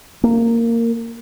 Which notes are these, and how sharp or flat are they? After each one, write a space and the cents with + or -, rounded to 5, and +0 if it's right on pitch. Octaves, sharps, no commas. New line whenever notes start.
A#3 -15